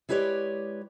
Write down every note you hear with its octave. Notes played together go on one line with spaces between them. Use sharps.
G#3 E4 G4 B4 C#5 D5